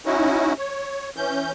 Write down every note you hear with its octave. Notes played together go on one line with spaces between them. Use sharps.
C#4 D#4 E4 F#4
C#5
E3 C#4 G6